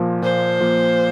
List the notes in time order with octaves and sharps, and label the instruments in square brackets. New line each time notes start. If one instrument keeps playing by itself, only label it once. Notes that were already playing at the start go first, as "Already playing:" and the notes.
Already playing: [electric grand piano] A#2 F3 A#3
[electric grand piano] A#2 [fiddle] C5
[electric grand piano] F3 A#3